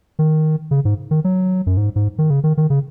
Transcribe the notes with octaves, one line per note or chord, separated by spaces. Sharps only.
D#3
C#3
G#2
D#3
F#3
F#2
G#2
G#2
D#3
C#3
D#3
D#3
C#3